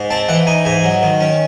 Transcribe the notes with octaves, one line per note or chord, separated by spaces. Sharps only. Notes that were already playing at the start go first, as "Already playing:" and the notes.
Already playing: G#2
C4 A5
E3 F#5
D#4 G#5
G#2 G#5
F#3
D#3
C#4